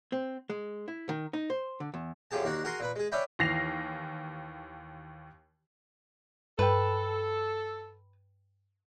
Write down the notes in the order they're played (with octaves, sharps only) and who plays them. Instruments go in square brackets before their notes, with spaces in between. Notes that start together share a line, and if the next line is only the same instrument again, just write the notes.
[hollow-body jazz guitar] C4
G#3
E4
D#3
D#4
C5
D3
E2
[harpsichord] F#2 D3 F3 G4 G#4 A5
D#2 A#3 D4 F#4 F#5
F#4 G#4 A#4 G#5 A#5 C6
A#2 B4 B5
G#3 G#4
C#4 D4 D5 E5 G5 B5
[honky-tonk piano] D#2 E3 A#6 C7 F7
[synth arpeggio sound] G2 G5 [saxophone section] A4 [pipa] B4